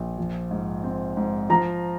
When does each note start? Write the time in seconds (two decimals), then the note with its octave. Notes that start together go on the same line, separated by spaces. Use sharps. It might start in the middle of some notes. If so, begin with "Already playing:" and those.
Already playing: A#1
0.18 F3
0.51 G#2
0.84 C4
1.17 G#2
1.50 F3 A#5